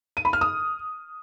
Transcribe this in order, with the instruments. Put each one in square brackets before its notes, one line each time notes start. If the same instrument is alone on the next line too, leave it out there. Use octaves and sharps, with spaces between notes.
[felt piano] D#7
B5
F6
D#6